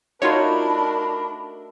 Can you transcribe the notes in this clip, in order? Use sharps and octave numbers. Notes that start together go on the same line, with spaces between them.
A3 D4 D#4 F4 F#4 A#4 C#5 B5